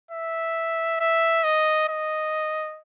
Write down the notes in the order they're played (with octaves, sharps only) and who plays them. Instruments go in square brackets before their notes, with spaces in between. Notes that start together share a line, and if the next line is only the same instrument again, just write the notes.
[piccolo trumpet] E5
E5
D#5
D#5